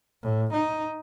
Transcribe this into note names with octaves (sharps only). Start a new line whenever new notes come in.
A2
D#4